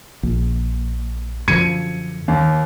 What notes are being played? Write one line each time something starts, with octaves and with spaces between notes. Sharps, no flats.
A#1
F#2 D3 F3 G#6 C#7 D#7
D#2